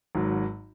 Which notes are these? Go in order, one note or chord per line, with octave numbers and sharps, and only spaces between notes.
G#1 G#2 F#3